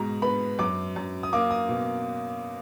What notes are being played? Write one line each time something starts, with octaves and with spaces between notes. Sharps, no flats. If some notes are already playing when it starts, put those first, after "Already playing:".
Already playing: G#2 B2 A#5
B3 B5
F#2 D6
F#2
D#6
A#3 D6
D#6
B2